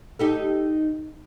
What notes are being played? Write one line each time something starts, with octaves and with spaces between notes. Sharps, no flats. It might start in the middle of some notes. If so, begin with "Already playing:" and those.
D#4 G4 A4